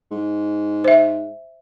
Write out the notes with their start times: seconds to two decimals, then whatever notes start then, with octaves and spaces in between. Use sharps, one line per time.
0.11 G#2
0.84 C5 E5